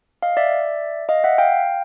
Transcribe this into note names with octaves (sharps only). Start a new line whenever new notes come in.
D#5 F5
D5 E5
D#5 F5
E5 F#5
F5 G5